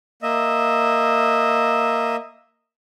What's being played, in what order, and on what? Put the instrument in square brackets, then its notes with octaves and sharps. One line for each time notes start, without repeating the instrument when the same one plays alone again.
[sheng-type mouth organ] A#3 D#5 E5